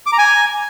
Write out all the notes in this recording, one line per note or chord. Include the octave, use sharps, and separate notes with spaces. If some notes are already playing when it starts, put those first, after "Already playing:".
D6
A#5
G#5